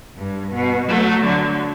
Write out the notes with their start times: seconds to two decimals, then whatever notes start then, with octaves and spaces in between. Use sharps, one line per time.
0.16 G2
0.53 B2
0.89 F#3 A3
1.25 D3 F#3